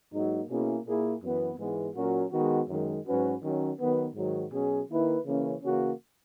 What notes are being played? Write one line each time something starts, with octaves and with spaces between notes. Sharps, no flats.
G#2 F#3 A#3 D#4
B2 A#3 C#4 E4 G#4
A#2 A#3 E4 G#4
F#2 E3 B3
G#2 E3 G#3 B3
A#2 F#3 C#4 F#4 A#4
D#3 G#3 B3 F#4
F#2 D#3 G#3
G#2 F#3 C#4 F#4 B4
D#3 F#3 C#4
D#3 F#3 B3
G#2 D#3 F#3
B2 F#3 C#4 G#4
D#3 A#3 E4 B4
C#3 E3 A#3 C#4
C#3 E3 A#3 C#4 F#4